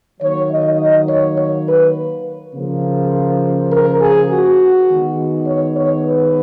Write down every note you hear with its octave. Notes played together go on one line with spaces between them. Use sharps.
D#3 F#3 A#3 C#5
D#5
D#5
C#5
C#5
B4
C#3 F3 A#3
A#4
G#4
F#4
D#3 G#3 B3
C#5
C#5
B4